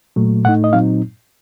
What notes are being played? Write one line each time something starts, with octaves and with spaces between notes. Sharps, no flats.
A#2 F#3 A3
A2 A3 D#4 F#5
D#5
A#2 F#3 C4 D#4 F5